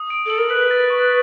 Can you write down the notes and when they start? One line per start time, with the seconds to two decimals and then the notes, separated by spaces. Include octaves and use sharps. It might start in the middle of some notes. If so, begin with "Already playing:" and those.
Already playing: D#6
0.10 D7
0.26 A4 F#7
0.38 A#4
0.50 B4 F#6
0.71 A6
0.90 C#6